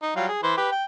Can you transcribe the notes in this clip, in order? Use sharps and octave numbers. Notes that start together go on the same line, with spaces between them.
D#4
F#3 G3 F4
G#4
E3 B4 C5
G4 B4
G5